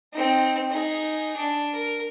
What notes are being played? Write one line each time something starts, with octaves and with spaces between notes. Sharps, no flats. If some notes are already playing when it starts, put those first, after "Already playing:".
C4 D#4
D#4 G#4
D4
A#4